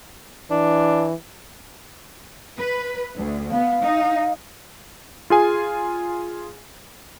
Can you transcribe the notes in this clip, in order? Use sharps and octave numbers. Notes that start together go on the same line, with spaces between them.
E3 D4
B4
D2
B3 F5
D#4
F4 G#4 G#5